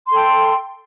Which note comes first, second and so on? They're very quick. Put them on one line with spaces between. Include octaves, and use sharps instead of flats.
C6 A4 G5